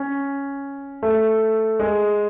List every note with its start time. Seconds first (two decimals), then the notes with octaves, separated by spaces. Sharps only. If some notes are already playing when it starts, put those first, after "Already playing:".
Already playing: C#4
1.03 A3
1.80 G#3